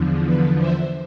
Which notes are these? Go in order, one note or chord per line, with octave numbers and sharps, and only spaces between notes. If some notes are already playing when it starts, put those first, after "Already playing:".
Already playing: E2 D3 F3
B4
C5 E5